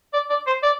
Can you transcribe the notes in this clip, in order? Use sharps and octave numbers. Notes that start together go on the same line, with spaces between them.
D5
D5
C5
D5